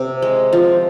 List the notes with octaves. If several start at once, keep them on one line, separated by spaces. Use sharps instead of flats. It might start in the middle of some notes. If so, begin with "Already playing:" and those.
Already playing: C3
G#3
F3